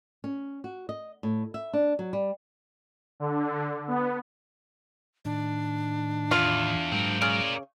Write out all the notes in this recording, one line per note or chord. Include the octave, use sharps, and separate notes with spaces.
C#4
F#4
D#5
A2
E5
D4
F#3
G3
D3
B3
A2 D#3 D4
E2 F4
G#2 F#3 G#3 C4 A#4
C#3 A#4 D5